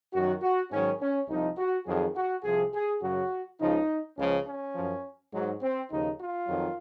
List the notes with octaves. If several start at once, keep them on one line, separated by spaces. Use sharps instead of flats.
F#2 D#3 F#3 F#4
F#4
G#2 D#3 F#3 C#4
C#4
C2 C3 F3 D#4
F#4
F2 D#3 F#3 G#4
F#4
C2 C3 F3 G#4
G#4
F#2 C#3 F#3 F#4
C#2 C#3 F3 D#4
C#2 C#3 F3 C#4
C#4
F#2 F3
G#2 F#3
C4
D#2 C#3 F3 D#4
F4
F2 D#3 F#3